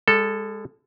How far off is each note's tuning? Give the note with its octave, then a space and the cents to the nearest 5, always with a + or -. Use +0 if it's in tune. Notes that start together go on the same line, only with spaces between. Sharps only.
G#3 -35 A4 +0